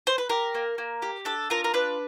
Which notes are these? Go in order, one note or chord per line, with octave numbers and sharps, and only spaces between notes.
C5
B4
G4 A#4
A#3
A#3
G4
D4 A4
F4 A#4
A#4
D4 B4